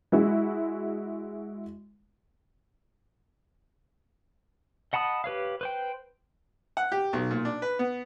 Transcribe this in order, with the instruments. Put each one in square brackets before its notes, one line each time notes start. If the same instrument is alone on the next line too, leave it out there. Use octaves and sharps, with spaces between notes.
[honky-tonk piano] G#3 E4 F#4
[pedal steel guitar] D#5 F#5 A5 B5 D#6
G4 B4 C#5 F5
B4 C5 G5
[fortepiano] F#5
G4
B1
A#2
D4
B4
B3